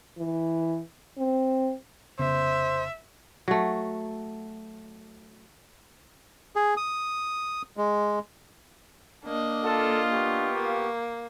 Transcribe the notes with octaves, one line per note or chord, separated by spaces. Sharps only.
E3
C4
F1 C#3 B3 C5 E5
F#3 A3
G#4
D#6
G#3
A#3 D4 D#5
F4 A4
B3 G4 C#6
A#3